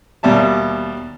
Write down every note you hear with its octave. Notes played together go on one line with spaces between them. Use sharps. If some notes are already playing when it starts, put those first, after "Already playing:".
D#2 B2 G3 E5 A5